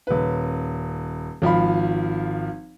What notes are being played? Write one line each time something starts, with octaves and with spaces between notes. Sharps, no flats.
D#1 B4
G#1 F3 F5 B5